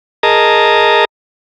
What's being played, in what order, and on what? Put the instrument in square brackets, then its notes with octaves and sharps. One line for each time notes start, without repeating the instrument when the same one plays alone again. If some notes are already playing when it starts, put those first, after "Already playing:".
[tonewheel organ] G#4 A#4 D#5 A5 A#5